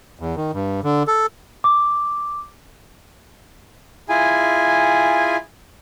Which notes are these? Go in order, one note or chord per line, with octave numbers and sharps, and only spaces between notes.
E2
D#3
G2
D3
A4
D6
E4 F4 G#4 G#5